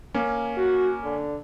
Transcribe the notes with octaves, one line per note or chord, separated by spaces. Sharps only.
A#3 C#4
F#4
D3